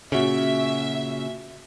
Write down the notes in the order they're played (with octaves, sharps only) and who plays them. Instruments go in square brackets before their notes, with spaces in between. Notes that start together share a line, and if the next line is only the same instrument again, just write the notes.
[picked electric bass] A#2 C#3 [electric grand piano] C#4 F#4 [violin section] E5